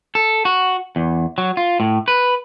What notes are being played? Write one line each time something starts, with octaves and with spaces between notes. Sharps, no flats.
A4
F#4
E2
F#3
F4
A2
B4